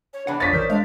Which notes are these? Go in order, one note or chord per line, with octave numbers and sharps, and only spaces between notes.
C#5
E3 B3 D4 F#5
D#4 C#5 D5 A6 B6
A1 A#4 C5 G6
G#3 D4 F5